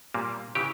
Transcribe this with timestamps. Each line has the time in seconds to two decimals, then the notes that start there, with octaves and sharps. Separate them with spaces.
0.14 A#2 G3 A#3
0.55 C#3 E3 G4